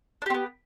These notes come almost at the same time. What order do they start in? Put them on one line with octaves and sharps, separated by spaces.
D4 G4 C4 B3